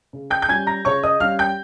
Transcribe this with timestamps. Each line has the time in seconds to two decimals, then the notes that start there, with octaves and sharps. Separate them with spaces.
0.13 C#3
0.30 G5 G6
0.42 G6
0.48 G3 C#4 G#5 G#6
0.67 A#5 A#6
0.85 C#3 C#5 C#6
1.03 D#5 D#6
1.20 G3 C#4 F5 F6
1.39 G5 G6